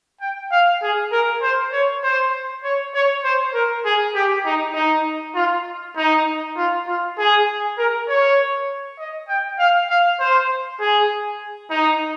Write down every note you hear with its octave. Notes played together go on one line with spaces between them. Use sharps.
G5
F5
G#4
A#4
C5
C#5
C5
C#5
C#5
C5
A#4
G#4
G4
D#4
D#4
F4
D#4
F4
F4
G#4
A#4
C#5
D#5
G5
F5
F5
C5
G#4
D#4